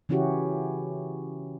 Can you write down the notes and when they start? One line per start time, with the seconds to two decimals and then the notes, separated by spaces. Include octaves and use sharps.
0.09 C#3 E3 C#4 E4 F#4 G4